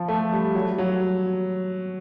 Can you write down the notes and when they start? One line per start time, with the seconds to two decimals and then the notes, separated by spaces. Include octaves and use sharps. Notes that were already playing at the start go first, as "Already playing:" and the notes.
Already playing: F3
0.08 A3
0.32 G3
0.55 F#3
0.78 F#3